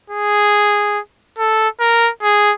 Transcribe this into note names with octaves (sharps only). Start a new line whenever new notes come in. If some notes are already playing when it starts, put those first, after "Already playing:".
G#4
A4
A#4
G#4